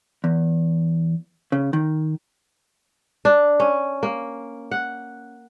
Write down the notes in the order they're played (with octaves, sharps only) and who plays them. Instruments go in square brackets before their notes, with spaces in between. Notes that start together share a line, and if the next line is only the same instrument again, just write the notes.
[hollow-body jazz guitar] E2
C#3
D#3
[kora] D4
C#4
A#3
F#5